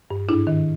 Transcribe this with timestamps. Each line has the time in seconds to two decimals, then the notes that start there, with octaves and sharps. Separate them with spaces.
0.10 G2
0.29 G#2 D4 E4
0.47 D#3